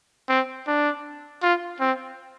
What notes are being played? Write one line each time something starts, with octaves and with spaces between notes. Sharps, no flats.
C4
D4
F4
C4